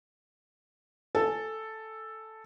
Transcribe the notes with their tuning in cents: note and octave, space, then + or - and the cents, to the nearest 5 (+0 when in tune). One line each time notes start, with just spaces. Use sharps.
A4 +0 G#5 +0